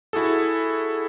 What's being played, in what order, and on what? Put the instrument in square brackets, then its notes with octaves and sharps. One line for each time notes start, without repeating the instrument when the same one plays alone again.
[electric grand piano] E4 F#4 G#4 A4